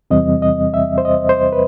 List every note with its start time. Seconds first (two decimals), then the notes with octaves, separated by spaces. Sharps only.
0.11 E2 C3 E3 G3 C4 D#5
0.42 D#5
0.74 E5
0.98 C5
1.05 D#5
1.29 C5
1.53 B4